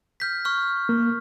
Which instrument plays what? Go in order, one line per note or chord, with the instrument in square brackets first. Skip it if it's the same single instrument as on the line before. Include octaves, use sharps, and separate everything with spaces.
[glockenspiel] F6 G6 B6
C#6 F6
[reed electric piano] A#3